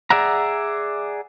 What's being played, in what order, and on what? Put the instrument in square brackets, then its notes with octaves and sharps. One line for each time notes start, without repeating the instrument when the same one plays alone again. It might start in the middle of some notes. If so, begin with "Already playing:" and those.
[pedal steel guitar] G#4 D5 E5 F#5 A#5